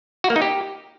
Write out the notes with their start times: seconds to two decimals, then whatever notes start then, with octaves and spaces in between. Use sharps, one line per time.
0.24 F#4
0.30 A#3
0.36 D#4
0.42 G4